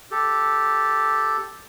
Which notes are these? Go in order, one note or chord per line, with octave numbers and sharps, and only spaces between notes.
G4 A4